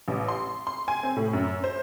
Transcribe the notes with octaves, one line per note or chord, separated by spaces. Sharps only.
A1
C6
C6
G#5
C4
A2
F#2
C5